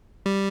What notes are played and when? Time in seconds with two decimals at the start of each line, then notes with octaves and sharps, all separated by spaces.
0.26 G3